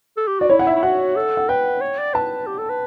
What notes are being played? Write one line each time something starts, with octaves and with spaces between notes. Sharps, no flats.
A4
G4
F#4 D5
E4 C#5
F#5
E5
E4
F#4 F#5
A4
F#5
B4 G5
C#5
D5
B4 A5
G4
A4
B4